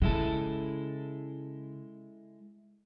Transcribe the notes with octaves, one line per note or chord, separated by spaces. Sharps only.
C#3 G#3 E4 A4